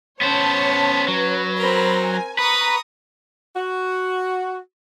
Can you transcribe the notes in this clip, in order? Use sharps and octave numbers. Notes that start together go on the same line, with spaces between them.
B3 C#4 C5 C#5 A5
F#3 B4 C#5
C4 A#4 B5
G#5
B4 A#5 B5 C#6 D#6
F#4